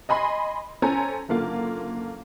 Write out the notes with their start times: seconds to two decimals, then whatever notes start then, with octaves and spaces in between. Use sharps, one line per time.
0.09 D#5 G#5 B5 C6
0.82 C#4 A4 C5 G#5 A#5
1.29 F#1 D3 A#3 F4